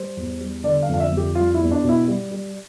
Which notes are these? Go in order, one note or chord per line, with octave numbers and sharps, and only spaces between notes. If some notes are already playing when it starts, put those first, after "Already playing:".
Already playing: G3 C5
E2
G3
D3 D5
F5
F2
F5
E5
F2
G4
G3 F4
E2 E4
D4
B2
E4
G3
G3